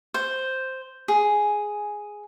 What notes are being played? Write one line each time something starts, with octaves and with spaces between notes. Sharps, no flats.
C5
G#4